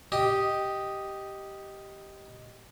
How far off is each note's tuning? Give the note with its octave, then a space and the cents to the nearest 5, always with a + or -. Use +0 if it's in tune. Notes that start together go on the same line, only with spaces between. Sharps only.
G4 -5 D#5 +0